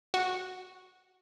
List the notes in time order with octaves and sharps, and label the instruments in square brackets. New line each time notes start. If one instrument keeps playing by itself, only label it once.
[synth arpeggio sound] F#4